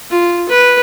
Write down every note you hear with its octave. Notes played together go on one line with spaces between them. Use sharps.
F4
B4